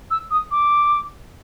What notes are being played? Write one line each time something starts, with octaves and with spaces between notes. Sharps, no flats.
E6
D#6
D6